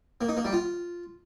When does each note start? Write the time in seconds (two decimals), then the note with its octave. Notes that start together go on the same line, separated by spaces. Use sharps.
0.21 A#3
0.29 D#4
0.37 A#3
0.45 G3
0.53 F4